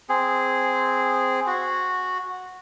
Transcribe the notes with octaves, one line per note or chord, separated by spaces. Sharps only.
C4 G#4
F#4